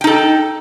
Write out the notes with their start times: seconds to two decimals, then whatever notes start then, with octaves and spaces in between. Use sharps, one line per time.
0.01 G5
0.04 D#4
0.07 A4